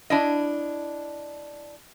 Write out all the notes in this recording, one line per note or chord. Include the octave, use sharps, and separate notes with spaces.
D4 E4 D#5